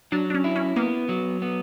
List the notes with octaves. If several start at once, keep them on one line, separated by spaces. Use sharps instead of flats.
F#3 D4
D4
C#4
E4
C#4
A#3 B3
F#3
B3